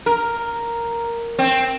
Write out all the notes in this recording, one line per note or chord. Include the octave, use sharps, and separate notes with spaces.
A#4
C4